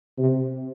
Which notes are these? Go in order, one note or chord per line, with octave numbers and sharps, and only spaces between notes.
C3